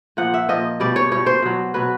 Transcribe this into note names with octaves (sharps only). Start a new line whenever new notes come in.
A#2 F3 F#5
E5
A#2 F3 D#5
B2 G3 D5
C#5
B2 G3 C#5
C5
B2 F#3
B2 F#3 B4